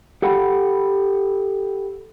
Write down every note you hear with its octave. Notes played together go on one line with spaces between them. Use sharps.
G4 A4 F#5 G5 B5